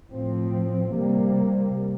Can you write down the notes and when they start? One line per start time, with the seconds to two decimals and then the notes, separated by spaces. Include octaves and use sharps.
0.11 A2 F3 C4
0.95 C3 G3 A#3